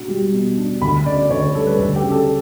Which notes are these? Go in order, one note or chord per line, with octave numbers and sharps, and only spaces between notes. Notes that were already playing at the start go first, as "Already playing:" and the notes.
Already playing: B2 D4 F#4
G3
B2
D4
D2 B5
C#3 D5
D2 C#5
G3 A4
B4
D2 A4
G4
C#3
A4